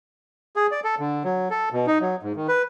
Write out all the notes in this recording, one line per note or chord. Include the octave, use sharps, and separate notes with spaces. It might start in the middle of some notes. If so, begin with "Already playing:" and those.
G#4
D5
A4
D3
F#3
A4
B2
D#4
F#3
G#2
D#3
B4